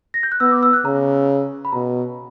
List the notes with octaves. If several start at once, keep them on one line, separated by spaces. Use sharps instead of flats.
A#6
G6
F#6
B3 E6
D6
E6
F#6
C#3 A#5
B5
B2 A#5